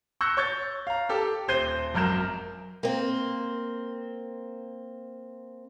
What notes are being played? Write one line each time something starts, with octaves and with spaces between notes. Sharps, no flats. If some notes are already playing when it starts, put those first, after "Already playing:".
C#6 E6 F#6 G6 A#6 C#7
C#5 C#6 G6 A6
F5 A#5
G4 A4
D#1 C5 G6 C7 D#7 G7
G#1 F#2 A#4 G6 E7
A#3 C4